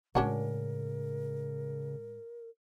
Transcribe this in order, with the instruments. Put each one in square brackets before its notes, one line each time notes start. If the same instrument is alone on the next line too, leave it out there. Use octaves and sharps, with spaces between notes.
[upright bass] A2 G#3 [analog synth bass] C#3 [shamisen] C#4 D4 F#4 [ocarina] A#4